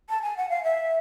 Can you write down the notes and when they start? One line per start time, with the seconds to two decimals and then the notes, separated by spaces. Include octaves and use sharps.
0.10 A5
0.22 G#5
0.37 F#5
0.50 F5
0.64 E5